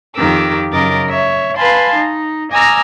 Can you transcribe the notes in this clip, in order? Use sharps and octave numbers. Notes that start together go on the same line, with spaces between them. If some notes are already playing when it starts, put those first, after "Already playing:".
F2 D#3 G4 A#4 D6 E6
F#2 C#3 A#4 D#5 D6 A6
C#5 E5
B4 F5 G#5 A5 B5 C6
D#4
D#5 G#5 A#5 D6 E6 F6